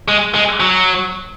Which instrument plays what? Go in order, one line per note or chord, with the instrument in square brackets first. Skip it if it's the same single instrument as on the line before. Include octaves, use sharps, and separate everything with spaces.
[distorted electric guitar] G#3
G#3
F#3